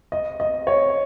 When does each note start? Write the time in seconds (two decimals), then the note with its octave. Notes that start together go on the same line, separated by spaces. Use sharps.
0.12 D#5
0.40 D#5
0.67 C#5